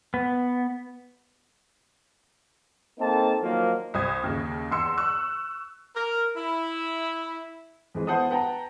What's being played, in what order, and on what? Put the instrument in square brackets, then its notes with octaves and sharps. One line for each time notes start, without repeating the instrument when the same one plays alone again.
[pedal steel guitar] B3
[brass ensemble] A#3 C4 D#4 A4 A5
D#3 F3 F#3 A#3
[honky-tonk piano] C2 C5 D#6 G#6
D#2 C#3
E2 C6 E6 C#7
C#6 E6 F#6
[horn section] A#4
E4
[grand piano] F2 E3 G#3
B3 E4 C5 F#5 A5 D#6
B4 F#5 G5 A5 A#5